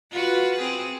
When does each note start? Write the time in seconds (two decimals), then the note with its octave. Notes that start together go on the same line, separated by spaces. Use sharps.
0.11 F4 F#4 B4
0.59 C4 G#4